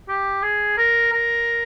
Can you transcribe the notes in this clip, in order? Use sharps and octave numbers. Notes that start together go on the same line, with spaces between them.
G4
G#4
A#4
A#4